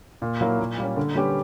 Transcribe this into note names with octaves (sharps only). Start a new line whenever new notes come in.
A#2
F#3 A#3 E4 A#4
A#2
G3 A#3 C#4
D3
G3 C#4 G4 B4